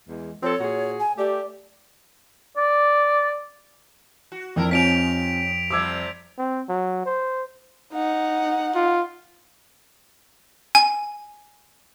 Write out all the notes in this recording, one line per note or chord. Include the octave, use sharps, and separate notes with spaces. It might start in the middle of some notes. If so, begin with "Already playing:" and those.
E2 G#3
F3 C4 A4 C#5
A#2 F#4 G#4
G#5
A3 G4 D5
D5
F#4
F2 D4 E4 A#4
C3 C4 C#4 D#4 F4 B6 D7 F7
C3 F3 G3 D6 E6 G#6
C4
F#3
C5
D#4 F#5
F4
G#5